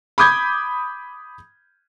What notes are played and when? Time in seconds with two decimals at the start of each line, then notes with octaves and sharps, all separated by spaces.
0.18 B5 D6 D#6 G6 G#6